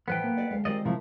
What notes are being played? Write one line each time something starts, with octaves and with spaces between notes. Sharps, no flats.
A2 E3 F3 A3 B3 B4 G5
A#3
A4 D5 D#5
D2 G#3 F5
D#3 G3 C4 F4 D5 D#5
C3 F3 A3 E4 A#4